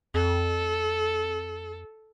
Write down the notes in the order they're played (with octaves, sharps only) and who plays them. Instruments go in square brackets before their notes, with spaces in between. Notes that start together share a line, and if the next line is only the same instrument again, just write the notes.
[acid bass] F2 [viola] A4